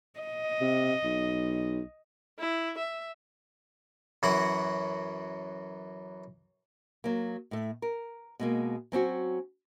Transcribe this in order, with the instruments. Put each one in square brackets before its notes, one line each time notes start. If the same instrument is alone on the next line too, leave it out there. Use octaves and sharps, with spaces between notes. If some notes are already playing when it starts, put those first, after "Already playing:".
[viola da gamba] D#5
[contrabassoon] C3
B1
[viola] E4
E5
[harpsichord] F#2 E3 F#4 F#5
[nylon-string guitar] F#3 A#3
A2 A3
A#4
B2 G#3 A#3
F#3 C4 C#4 F#4